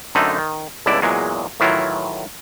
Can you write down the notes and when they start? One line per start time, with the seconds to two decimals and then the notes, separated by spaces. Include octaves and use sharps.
0.15 F#2 D3 A3 C4 D#4
0.38 D#3
0.86 G1 C#2 D3 E4 D5 A5
1.02 E2 A#2 F#3 G#3
1.60 A2 D#3 E3 F#3 E4 F4